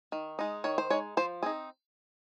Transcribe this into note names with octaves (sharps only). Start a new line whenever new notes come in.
D#3
G#3 D#4
D#3 C#5
C5
G#3 D#4 C#5
F3 C5
C4 D#4 G#4